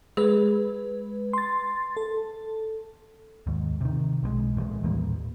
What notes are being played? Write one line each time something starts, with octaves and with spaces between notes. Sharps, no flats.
G#3 G#4 B4
C6 A6
A4
D#2 G#2
C3 D#3
B1 F3 G#3
A#2 E3 F3 G#3
D#2 A2 G3 A#3